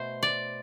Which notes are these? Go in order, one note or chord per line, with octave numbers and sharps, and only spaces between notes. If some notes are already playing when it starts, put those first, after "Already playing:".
Already playing: B2 A3 C5
D5